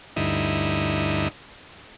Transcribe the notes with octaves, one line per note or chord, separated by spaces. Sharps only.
D2 G2 D#4 E4